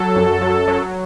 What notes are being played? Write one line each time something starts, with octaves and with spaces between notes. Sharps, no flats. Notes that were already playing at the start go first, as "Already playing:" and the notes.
Already playing: F#3 A4
F#2
F#3
F#3